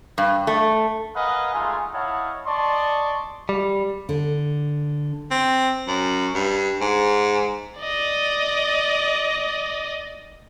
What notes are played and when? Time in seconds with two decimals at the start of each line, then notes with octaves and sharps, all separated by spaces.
0.18 G2
0.47 A3
1.16 A#4 B4 D#5 F5 F#5 G#5
1.54 G#3 A3 D#4 F4 F5 G#5
1.94 E4 C#5 D#5 F5 F#5 A5
2.47 D5 D#5 A5 C6 C#6
3.49 G3
4.09 D3
5.31 C4
5.88 F#2
6.35 G2
6.81 G#2
7.80 D5 D#5